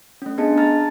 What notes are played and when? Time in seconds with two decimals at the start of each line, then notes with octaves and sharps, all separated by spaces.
0.22 A3 C#4
0.38 B3 D4 G#4 D#5 A5
0.57 A5 A#5 F6 A6